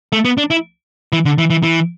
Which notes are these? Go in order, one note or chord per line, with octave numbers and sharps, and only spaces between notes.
A3
B3
D4
E4
E3
D3
E3
E3
E3